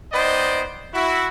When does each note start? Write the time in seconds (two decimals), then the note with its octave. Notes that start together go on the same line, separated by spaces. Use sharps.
0.13 B3 D#4 C5 D5 D#5 G5
0.93 E4 F#4